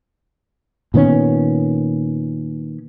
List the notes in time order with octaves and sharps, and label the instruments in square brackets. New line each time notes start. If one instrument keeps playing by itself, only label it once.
[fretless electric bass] A#2 D#3 B3 C#4